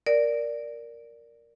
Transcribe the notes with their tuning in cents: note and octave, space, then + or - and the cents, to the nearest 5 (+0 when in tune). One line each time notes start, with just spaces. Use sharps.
A#4 +0 D5 +0